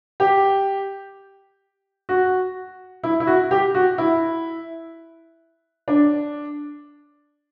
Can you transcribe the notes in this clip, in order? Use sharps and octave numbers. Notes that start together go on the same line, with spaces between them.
G4
F#4
E4
E4
F#4
G4
F#4
E4
D4